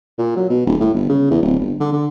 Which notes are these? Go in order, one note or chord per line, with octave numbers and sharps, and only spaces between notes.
A#2
F#3
B2
D#1
A2
G1
C#3
E2
D1
G1
D3
D3